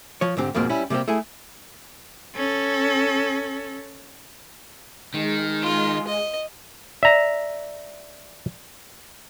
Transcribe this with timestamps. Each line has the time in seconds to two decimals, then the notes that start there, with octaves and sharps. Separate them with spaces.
0.21 F3 C#5
0.37 G#2 D3 C4 G4
0.55 F2 G#2 B2 G#3 A#3 C4
0.69 G3 C#4 E4
0.90 C3 G3 A#3 C4 G4
1.08 A3 E4 G#4
2.35 C#4 A4
5.14 D#3 G#3
5.62 F4
6.07 D#5
7.03 D5 E5 A#5